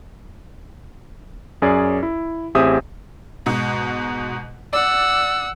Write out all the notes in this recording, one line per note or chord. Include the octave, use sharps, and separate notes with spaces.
F#2 C#4 G#4 D5
E4
A1 C4 G4 G#4 E5 D#6
G#2 B2
D5 F#5 E6